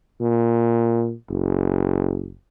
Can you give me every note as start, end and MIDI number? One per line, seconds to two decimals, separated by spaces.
0.21 1.13 46
1.30 2.34 30